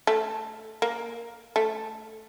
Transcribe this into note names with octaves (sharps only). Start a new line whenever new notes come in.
A3
A#3
A3